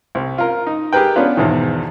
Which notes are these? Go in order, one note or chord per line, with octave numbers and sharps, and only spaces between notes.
C2
F4 A#4
D#4
G4 G#4 A#4 B4 G5
B3 C#4 D4 F4 B4
E2 G#2 B2 D#3